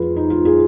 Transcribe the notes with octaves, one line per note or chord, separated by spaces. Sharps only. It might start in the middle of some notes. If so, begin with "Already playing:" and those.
Already playing: F2 F4 G#4 B4
D#4
F4
F4 G#4